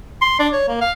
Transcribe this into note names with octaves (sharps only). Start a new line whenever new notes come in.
C6
D4
C#5
A#3
F5